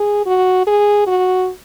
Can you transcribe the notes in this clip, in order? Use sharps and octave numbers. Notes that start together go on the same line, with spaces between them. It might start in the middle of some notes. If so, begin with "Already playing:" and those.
Already playing: G#4
F#4
G#4
F#4